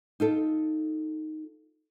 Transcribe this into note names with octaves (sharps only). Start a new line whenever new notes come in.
D#4 F4 A4